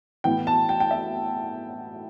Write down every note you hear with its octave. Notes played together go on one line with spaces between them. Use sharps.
A2 E3 B3 G5
A5
G5
G5
E5